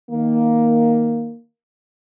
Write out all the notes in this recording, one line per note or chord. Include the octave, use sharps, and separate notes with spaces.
D#3 A#3